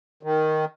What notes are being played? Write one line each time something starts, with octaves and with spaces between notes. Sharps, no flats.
D#3